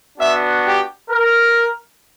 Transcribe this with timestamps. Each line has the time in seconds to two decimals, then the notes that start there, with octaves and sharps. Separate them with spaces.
0.18 B3 D4 F#4 E5
0.65 G4
1.09 A#4